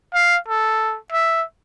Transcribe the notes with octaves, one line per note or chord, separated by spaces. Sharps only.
F5
A4
E5